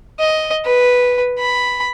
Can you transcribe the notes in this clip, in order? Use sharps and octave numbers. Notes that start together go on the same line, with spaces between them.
D#5
B4
B5